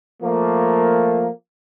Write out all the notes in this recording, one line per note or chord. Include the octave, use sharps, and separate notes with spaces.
F3 A3 A#3